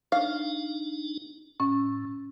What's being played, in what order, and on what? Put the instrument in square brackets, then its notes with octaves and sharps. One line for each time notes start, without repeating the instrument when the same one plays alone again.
[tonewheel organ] D4 D#4 [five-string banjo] F5
[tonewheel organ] A2 [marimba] C#4